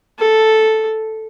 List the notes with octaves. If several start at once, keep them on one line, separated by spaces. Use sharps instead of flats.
A4